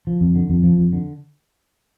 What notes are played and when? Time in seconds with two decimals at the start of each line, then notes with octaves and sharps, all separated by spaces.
0.07 F3
0.21 F2
0.35 D3
0.50 F2
0.63 F3
0.78 F2
0.93 D3